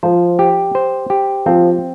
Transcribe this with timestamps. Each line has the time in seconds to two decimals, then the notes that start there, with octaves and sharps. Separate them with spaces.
0.03 F3 C5
0.39 G4
0.75 C5
1.10 G4
1.46 F3 C4